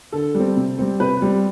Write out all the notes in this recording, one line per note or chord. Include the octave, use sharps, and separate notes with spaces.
D3 A4
G3 C4
C3
G3 C4
C3 B4
G3 C4